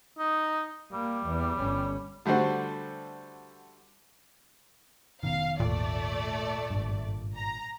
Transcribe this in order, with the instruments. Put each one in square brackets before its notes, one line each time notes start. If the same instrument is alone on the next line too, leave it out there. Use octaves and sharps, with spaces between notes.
[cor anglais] D#4
[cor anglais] G3 [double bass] A#3
[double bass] E2
G1 C#4
[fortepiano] D3 G3 A3 F#4 C5
[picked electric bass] F1 B2 D#3 [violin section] F5
[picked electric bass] G#1 D#2 [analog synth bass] A#2 [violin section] A3 D5
[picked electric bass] G#1 G2
[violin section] A#5